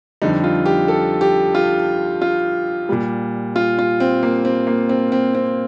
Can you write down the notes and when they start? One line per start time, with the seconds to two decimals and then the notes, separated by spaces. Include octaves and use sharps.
0.22 F2 D3 G3 D#4
0.44 F4
0.66 G4
0.88 A4
1.21 G4
1.55 F4
2.21 F4
2.89 A#2 G3
3.56 F4
3.78 F4
4.00 C4
4.23 A#3
4.45 C4
4.67 A#3
4.89 C4
5.12 C4
5.35 C4